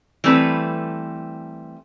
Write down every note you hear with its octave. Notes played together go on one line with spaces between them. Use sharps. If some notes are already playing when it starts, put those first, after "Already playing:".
E3 G3 A3 C4 A4 B4